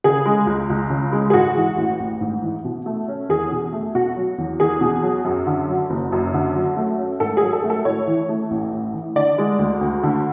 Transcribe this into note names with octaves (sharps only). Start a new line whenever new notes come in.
C#3 G#4
G#3
C#2
C#2
C#3
G#3
G#4
G#2 F#4
E3
A1
A1
G#2
E3
B2
A3
C#4
E2 G#4
B2
A3
B2 F#4
F#3
E2
E2 G#4
B2
F#3
F#2
D3
F#3
F#1
F#2
D3
F#3
A3
C#4
G#2 A4
G#4
F#3
A4
A3
A4
A2 C#5
E3
A3
A1
A2
E3
D3 D5
G#3
D2
D2
D3